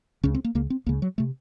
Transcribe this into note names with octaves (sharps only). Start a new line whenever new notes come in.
C#2 C#3 C#4
C4
A#3
C#2 C#3 A#3
C4
C#2 C#3 A#3
F#3
C3 A3